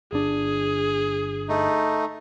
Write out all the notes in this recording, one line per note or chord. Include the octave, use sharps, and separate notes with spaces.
G1 D4 G#4
A3 D#4